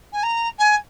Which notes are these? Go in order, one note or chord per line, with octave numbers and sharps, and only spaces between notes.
G#5
A#5
G#5